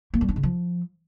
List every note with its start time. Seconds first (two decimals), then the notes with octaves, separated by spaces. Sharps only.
0.14 A#3
0.21 G3
0.28 D4
0.36 C#3
0.43 F3